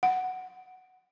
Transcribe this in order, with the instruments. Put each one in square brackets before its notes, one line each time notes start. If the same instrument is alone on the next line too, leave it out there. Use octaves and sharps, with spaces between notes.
[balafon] F#5